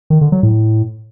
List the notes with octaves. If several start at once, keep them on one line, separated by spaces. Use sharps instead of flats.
D#3
D3
F#3
A2